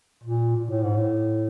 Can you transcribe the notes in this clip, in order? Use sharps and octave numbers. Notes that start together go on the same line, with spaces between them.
A#2
A#2
A2
G#2
A2